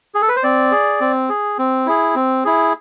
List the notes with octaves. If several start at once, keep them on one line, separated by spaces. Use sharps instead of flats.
G#4
A4
B4
C5
C4 D5
G#4
C4
G#4
C4
E4 G#4
C4
E4 G#4